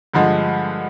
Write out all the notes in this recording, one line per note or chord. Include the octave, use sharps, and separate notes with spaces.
G2 D3 F3 G#3